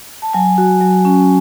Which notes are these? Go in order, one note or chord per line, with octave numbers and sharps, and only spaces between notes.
A5
F#3 G#5
F#4
F#3
C#4